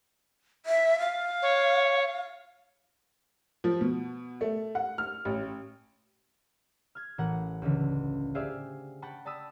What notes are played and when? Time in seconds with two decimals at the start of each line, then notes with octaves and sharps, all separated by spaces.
0.66 E5
0.99 F5
1.42 C#5
3.64 F3
3.81 B2
4.41 A3
4.75 F#5
4.98 F6
5.25 A1
6.95 F6 G#6
7.18 A1 E3 A#4 F#5
7.62 C#2 D3 E3 C#4
8.34 G4 G#4 C5 D5 E5 F5
9.02 F#5 G5 A5 B5 C#6
9.25 D5 A5 B5 D#6 E6